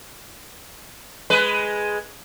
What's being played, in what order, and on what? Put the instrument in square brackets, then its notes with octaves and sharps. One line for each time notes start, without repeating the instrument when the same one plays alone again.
[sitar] G#3 B4